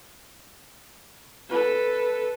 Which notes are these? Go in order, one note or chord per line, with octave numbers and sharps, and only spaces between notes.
A4 B4